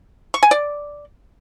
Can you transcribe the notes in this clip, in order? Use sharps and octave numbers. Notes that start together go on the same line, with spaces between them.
C#6
G#5
D5